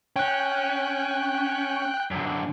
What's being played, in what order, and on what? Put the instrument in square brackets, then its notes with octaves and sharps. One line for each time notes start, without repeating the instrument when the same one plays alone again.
[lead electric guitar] C#4 [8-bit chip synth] G5 F#6
[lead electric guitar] F#2 D3